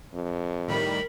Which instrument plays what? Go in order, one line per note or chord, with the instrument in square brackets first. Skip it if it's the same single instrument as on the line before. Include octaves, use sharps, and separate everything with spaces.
[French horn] F2
[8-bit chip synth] A2 D#3 G3 [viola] A#4 B5